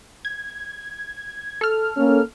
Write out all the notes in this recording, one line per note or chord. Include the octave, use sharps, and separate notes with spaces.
G#6
A4 F6
A#3 C#4